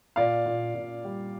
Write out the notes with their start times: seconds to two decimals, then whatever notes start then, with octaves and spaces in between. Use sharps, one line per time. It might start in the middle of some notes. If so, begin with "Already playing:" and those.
0.16 A#2 D5 F5
0.46 A#2
0.74 A#2
1.04 G3